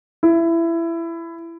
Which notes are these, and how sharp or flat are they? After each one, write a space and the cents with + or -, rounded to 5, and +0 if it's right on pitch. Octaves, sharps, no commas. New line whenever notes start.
E4 +20